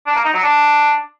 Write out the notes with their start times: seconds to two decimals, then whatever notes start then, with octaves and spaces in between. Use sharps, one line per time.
0.06 D4
0.15 A#3
0.25 D#4
0.34 F#3
0.43 D4